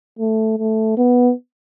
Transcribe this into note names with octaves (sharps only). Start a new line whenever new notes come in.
A3
A3
B3